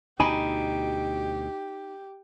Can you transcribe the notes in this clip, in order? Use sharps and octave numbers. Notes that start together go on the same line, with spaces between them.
D2 B2 D#4 G4 G#5 B5